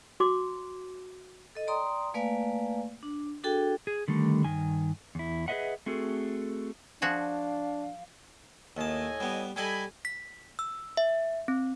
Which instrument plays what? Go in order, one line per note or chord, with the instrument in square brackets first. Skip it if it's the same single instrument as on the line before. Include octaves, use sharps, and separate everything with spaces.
[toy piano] F#4 C6 D6
[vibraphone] A4 D#5
D5 G5 A#5 C6 D#6
A3 A#3 B4 D5 F5 G#5
D4
D4 F#4 G#4 A4 G5
[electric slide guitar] G#4
D3 D#3 G3 A3
G2 D#3 G#5
E2 E4
G#4 B4 C5 D#5 E5 F#5
A3 C4 F#4 G#4 A4
[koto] F3 F#4 G#4 [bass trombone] D4 [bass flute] F5
[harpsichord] D#2 A5 [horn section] A2 D#5 G#5
[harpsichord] G3 B3
[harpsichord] G3 A4 D#5 [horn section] G#5 B5
[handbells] B6
E6
E5
C4